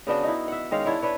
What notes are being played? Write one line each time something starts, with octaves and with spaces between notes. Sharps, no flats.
C#3 B3 D4 F#4
D#4 E4
E5 F#5
D#3 G#3 C#4 F5
D4 E4 C#5 D5
D4 B4 C#5